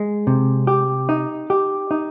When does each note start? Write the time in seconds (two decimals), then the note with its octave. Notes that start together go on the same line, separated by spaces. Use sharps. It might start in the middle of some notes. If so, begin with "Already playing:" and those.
Already playing: G#3
0.27 C3
0.67 G4
1.09 D#4
1.50 G4
1.91 D#4